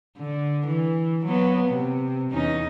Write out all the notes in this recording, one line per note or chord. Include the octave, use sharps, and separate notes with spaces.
D3
E3
F#3 A#3 B3
C3
E2 C#4 D#4